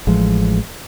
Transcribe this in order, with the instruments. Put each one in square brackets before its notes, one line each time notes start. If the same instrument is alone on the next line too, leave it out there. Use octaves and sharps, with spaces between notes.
[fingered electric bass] A1 F3 G#3